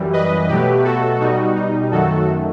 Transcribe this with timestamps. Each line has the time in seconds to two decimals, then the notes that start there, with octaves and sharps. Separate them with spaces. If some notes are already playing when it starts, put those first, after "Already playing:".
Already playing: F#2 E3 G3
0.13 B4 D#5
0.49 B2 F#3 A3 G4 B4
0.84 F#4 A4
1.20 B2 G3 D#4 F#4
1.56 D#4
1.92 F#2 D#3 F#3 A3 F#4 A4